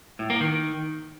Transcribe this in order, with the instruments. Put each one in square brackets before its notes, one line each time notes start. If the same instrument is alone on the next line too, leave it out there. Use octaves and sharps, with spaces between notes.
[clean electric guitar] A2
A#3
D#3